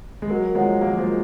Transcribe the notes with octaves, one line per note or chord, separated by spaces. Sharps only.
G#3
F#3 A#4
F3 G#3 C#5 F#5 A#5
F#3 A#3 F#4
F3 G#3
A#4